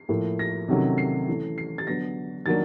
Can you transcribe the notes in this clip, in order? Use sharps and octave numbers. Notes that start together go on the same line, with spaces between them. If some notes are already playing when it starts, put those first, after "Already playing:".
Already playing: C7
A2 F3 A#3
A#6
C3 D#3 F#3 A3 C#4
C7
E3 A3 C#4
C7
A6
D3 F#3 B3 D4 A#6
D#3 F#3 A#3 D4 A6